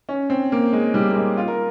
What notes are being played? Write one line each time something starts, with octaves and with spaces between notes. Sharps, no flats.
C#4
C4
A#3
G#3
G3
A#3
G#3
F4
A#4